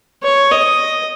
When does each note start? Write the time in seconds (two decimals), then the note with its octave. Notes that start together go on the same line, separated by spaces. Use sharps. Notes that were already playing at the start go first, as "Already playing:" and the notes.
0.23 C#5
0.52 D#5